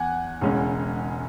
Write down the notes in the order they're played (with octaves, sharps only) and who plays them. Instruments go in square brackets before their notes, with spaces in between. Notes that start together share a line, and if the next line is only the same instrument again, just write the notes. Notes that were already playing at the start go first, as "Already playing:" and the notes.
Already playing: [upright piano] E2 [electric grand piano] F#5 G#5
[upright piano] E1 C#3 G#3 C#4